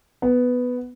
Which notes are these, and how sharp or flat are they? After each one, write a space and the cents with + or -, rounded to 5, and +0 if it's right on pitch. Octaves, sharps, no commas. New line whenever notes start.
B3 +5